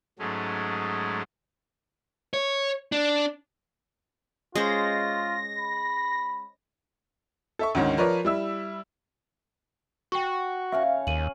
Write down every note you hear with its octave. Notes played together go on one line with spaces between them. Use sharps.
G#2 F#3 G#3 A3 C#4
C#5
D4
G#3 C#4 F4 C5 A#6
B5
A4 E5 C#6
D2 G#2 D#3 C#4
F3 A#4 B4 C#5 D5
G3 E4 E6
F#4 G5 C#6
C#3 E5 F5 C#6
D#2 D#7 F#7